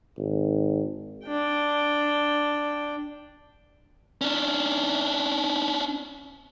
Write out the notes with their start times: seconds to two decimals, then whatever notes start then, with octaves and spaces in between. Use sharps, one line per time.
0.18 G#1
1.27 D4 G5
4.21 C#4 D4